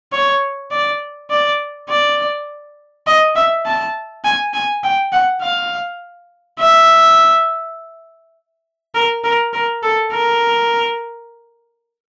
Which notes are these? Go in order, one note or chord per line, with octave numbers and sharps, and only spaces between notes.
C#5
D5
D5
D5
D#5
E5
A5
G#5
G#5
G5
F#5
F5
E5
A#4
A#4
A#4
A4
A#4